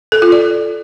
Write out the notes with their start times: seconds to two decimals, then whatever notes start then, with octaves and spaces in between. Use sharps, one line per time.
0.12 A4
0.22 F4
0.32 D5